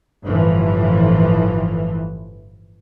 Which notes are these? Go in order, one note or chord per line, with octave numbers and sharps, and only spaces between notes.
G1 A2 E3 F3